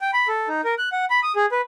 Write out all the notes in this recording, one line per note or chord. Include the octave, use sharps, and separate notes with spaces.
G5
B5
A4
D#4
A#4
F#6
F#5
B5
D#6
G#4
B4